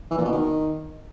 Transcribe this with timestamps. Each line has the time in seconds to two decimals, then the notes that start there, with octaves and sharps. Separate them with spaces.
0.11 E3
0.18 A#2
0.25 B2
0.32 D#3